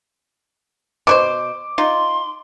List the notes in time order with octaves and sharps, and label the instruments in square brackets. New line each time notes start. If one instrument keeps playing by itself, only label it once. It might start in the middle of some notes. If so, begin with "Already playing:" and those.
[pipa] B2 E4 C5 [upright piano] D6
[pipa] D#4 F4 [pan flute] C6